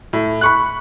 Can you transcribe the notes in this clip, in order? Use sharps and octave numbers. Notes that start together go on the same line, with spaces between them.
A2
B5 C#6 F#6